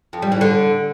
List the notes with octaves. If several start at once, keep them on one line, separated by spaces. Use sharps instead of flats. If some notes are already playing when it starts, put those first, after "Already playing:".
F2
G3
E3
D3